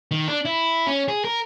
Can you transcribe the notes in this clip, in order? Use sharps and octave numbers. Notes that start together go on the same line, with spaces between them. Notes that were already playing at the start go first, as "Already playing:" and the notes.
D#3
D4
E4
C#4
G#4
A#4